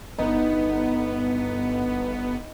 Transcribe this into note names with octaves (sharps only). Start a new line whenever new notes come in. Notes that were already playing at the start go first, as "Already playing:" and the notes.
G1 B3 D#4